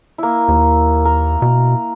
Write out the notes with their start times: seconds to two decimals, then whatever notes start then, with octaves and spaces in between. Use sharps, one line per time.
0.18 A#3 E4
0.48 D#2
1.05 A#4
1.42 B2